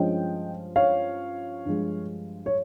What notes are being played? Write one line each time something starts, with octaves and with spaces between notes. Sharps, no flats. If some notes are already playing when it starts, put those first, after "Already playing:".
Already playing: G2 F3 G#3 C#4 D#5 G5
C#5 F5
G2 F3 G#3
C#5